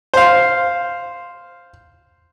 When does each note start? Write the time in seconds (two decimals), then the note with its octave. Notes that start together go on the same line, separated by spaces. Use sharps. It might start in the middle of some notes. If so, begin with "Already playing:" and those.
0.14 C5 F5